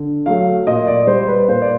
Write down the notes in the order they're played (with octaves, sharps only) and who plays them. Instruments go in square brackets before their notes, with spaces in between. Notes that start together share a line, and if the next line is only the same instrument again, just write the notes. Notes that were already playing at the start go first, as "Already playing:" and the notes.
Already playing: [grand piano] D3
F#3 A3 F5
A#2 D#5
D5
G3 C5
B4
A#2 C5
D5